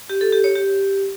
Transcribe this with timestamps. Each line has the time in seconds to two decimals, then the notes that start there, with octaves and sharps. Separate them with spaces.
0.10 G4
0.21 A4
0.33 G4
0.44 C#5
0.56 G4